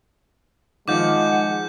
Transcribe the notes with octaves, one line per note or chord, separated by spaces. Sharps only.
D#3 F3 G#3 F4 F#5 D6 G6